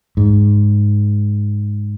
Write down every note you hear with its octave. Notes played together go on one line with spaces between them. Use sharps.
G#2